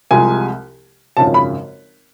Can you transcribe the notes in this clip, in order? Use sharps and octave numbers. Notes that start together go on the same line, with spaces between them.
C2 C3 F3 G#3 G#5
G#1 F#2 C#3 F3 A5
B5